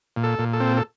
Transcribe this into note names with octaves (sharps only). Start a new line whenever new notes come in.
A#2
A4
A#2
A4
C4
A4